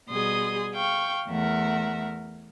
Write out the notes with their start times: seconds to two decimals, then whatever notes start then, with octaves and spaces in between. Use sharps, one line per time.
0.11 B2 G3 G#4 C6 D#6
0.73 F5 G5 C#6
1.30 E2 A3 A#4 E5 F#5